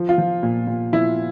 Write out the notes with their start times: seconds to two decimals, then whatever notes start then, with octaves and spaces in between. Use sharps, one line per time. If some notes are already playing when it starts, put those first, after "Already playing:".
Already playing: F3
0.09 F4
0.18 F3
0.43 A#2
0.67 A#2
0.92 F3 E4